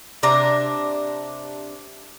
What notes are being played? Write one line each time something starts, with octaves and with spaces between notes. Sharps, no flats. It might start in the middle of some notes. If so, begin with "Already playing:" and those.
C3 D4 A#5